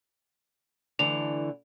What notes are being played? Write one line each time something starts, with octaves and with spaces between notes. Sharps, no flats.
D3 E3 A3 F7